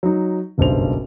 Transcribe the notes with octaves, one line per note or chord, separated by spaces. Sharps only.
F#3 D#4
F#1 B1 G2 C5 F7